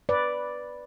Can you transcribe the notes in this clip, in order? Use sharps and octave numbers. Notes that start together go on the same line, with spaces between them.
B4 D5